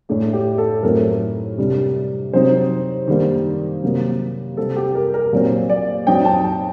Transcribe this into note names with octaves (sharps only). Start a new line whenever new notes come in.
A2 A3 D4
G4
A4
A2 F#3 A3 C4 D#4 A#4
C3 G3 D4
C3 F#3 C4 D#4 C5
D#3 G3 A#3 D4
C3 F#3 A#3
C3 G3 C4 A4
G4
A#4
A#4
A#2 F#3 C4
D5
F#3 C4 D#4 G5
A5
A5